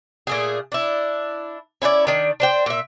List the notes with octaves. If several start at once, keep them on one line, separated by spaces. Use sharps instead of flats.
A#2 A3 G#4
D4 E4
C#4 E4 B4 D5
D#3 D4
D4 C5 G5
A#2 E5